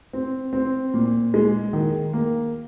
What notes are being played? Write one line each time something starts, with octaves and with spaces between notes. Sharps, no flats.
C4
C4
A#2
G#3
D#3
A#3